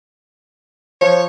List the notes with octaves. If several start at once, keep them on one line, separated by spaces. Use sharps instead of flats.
F3 C#5